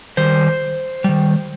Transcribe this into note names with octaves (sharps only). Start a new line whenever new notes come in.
D#3 G3 C5
D#3 G3